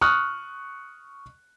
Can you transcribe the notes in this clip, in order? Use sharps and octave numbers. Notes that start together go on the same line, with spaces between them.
C#6 D#6 F6 F#6